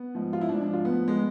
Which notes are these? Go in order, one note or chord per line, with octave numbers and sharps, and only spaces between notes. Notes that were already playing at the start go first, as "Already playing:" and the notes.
Already playing: B3
G#2 F3
F4
E4
G#2 F3 D4
D4
F4
A2 F3 B3
G#3